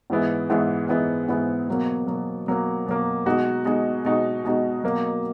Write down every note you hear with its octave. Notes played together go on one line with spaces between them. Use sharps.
G#2 E3 G#3 B3 E4
G#2 E3 G#3 B3 E4
G#2 E3 G#3 B3 E4
G#2 E3 G#3 B3 E4
B2 F#3 A#3
B2 F#3 A#3
B2 F#3 A#3
B2 F#3 A#3
B2 G#3 D#4 F#4
B2 G#3 D#4 F#4
B2 G#3 D#4 F#4
B2 G#3 D#4 F#4
B2 F#3 A#3